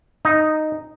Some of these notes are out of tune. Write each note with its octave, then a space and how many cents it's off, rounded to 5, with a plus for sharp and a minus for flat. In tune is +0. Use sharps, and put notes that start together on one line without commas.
D#4 -5